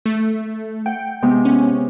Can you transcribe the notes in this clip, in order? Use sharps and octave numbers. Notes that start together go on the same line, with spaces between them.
A3
F#5 G5
C3 G#3 B3
C#4